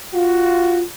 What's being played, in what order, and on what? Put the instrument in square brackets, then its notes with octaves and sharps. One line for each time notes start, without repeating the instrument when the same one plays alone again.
[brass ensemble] F4 F#4